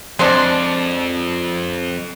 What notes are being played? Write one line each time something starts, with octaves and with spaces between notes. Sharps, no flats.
F2 G#3 C4 D4